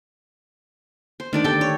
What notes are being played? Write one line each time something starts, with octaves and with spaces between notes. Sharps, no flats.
C5
D#3 A3 D4 A#4 D5
D3 D#3 G4 A4 D5 G5
G4 C#5